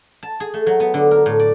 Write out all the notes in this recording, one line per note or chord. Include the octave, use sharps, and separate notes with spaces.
A5
G#4
A3
F#3
B3
D3
A#4
A2
D5